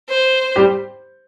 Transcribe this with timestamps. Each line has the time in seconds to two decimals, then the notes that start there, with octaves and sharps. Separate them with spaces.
0.09 C5
0.56 G3 G4